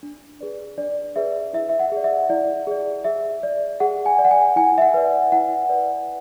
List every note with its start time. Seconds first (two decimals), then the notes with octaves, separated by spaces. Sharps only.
0.03 D4
0.40 G#4 B4 D5
0.78 D4 D5
1.16 G#4 B4 D5 E5
1.53 E4 E5
1.69 E5
1.79 F#5
1.92 G#4 D5
2.04 E5
2.30 E4 D5
2.67 G#4 D5
3.04 G#4 E5
3.43 D5
3.80 G#4 F#5
4.06 G#5
4.19 D5
4.25 F#5
4.31 G#5
4.56 E4 G#5
4.78 E5
4.82 F#5
4.94 B4 D5
5.32 E4 F#5
5.69 B4 D5